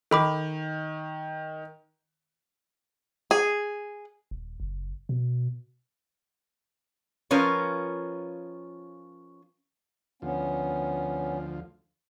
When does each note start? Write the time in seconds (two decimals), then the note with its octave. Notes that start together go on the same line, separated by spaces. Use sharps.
0.11 D#3 A4 B5 D6
3.31 G#4
4.31 D#1
4.60 F#1
5.09 B2
7.31 F3 C#4 F4 A#4 B4 C#5
10.22 D2 F3 B3 C#4